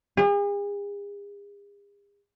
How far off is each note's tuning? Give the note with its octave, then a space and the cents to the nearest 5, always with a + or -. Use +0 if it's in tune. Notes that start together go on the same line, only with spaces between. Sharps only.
G#4 -45